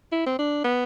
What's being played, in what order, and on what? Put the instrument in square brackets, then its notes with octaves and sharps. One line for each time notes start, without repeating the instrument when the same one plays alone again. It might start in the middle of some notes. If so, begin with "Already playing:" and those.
[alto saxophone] E4
C4
D4
B3